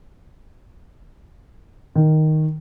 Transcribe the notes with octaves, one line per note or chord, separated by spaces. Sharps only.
D#3